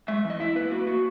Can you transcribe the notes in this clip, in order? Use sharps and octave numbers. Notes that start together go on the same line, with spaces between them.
G#3 E5
E2
D#5
E4 E5
A#3 B4
A#3 F#4
A#3 F#4